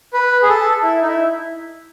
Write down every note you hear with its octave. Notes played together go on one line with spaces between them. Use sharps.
B4
G#4
A4
E4
D#4
E4